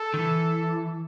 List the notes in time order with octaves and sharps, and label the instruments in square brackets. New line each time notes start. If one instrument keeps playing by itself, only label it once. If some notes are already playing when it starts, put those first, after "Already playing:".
Already playing: [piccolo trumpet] A4
[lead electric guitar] D#3
E3